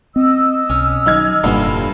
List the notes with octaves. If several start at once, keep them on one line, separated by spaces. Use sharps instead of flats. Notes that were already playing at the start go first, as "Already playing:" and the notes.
C4 D#5 E6
B1 C#4
D#3 F#3 D#4 F6 G#6
F1 G2 A#2 D3 E3